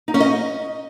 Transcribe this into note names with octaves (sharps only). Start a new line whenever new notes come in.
D#4
C#4
D#5